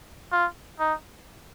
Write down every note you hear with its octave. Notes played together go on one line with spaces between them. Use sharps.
F4
D#4